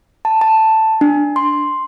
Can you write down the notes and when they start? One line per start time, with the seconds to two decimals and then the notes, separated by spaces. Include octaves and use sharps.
0.25 A5
0.41 A5
1.01 D4
1.36 C6